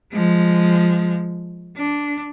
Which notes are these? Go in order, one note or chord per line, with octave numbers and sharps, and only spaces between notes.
F3 G#3
D4